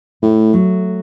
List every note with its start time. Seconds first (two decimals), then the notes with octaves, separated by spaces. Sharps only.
0.22 A2 A3
0.53 F#3